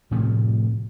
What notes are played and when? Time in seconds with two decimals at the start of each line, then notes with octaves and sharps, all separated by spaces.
0.11 A2 C3 F3 A3